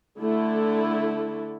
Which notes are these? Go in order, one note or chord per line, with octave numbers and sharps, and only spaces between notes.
D3 A3 E4 A4